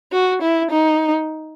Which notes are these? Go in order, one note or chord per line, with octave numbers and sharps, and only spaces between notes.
F#4
E4
D#4